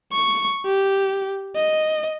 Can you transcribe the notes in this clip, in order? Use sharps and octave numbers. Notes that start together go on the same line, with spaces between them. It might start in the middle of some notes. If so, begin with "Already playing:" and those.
C#6
G4
D#5